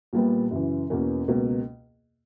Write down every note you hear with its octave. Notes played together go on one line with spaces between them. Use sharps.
A#1 A#2 G3 B3
F#2 C#3 E3
E2 B2 A#3 C#4
C#2 B2 A#3